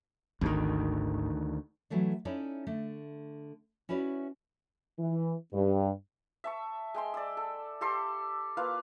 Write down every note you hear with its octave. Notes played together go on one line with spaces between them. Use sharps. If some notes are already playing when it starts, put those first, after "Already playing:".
G#1 D2 D#3
E3 F#3 A3 D4
C#4 D#4 E4 A4 C#5 D5
D3 A3
C#4 E4 F#4 B4 C#5 D5
E3
G2
E5 A5 C#6
G#3 G5 C6
D5 E6
A4
G4 A4 C6 D6
A#3 F4 B4 F5